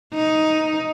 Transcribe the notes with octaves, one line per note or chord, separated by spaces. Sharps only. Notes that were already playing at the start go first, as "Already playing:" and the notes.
D#4